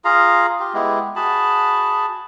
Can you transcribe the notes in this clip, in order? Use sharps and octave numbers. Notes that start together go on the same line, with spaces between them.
F4 G#4 F5 A#5
F4 G4
G#3 B3 E4 G4
F#4 G#4 A5 B5